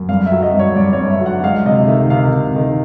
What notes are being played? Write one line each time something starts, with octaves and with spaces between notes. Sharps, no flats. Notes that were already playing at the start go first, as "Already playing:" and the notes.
Already playing: F#2
G2 F5
E5
F#3
D#5
G2
C#5
G2 D5
C#5
G2
E5
F#3 F#5
G#3 F5
C3 D#5
D#3 E5
C3 F5
C3
D#3